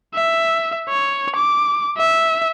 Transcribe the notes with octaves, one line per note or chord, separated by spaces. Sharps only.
E5
C#5
D6
E5